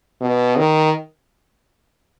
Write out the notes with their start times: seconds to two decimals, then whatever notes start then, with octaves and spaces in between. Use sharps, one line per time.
0.21 B2
0.58 D#3